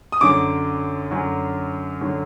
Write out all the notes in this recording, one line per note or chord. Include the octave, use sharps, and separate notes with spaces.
D#6
F#2 D3 F#3 D6
F#2 D3 F#3
D3 F#3